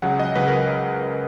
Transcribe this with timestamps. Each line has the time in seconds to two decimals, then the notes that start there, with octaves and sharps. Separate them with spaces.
0.02 C#2 C#3 F#3 F#5
0.19 D#5
0.35 C#2 C#3 F#3 B4
0.48 A#4